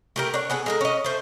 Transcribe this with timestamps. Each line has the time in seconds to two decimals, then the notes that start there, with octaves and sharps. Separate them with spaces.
0.16 A3 G4 A#4
0.34 D4 C#5
0.50 B3 G#4 A4
0.66 G#3 A4 A#4
0.81 C#4 D#5
1.04 A3 C5